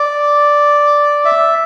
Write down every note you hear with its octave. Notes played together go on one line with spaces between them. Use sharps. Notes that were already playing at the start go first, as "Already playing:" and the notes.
Already playing: D5
E5